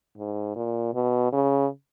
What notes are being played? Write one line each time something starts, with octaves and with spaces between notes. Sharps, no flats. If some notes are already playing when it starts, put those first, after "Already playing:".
G#2
A#2
B2
C#3